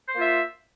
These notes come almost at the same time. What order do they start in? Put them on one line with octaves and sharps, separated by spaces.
C5 A#3 F4 E5